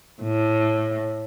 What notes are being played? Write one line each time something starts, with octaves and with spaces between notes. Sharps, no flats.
A2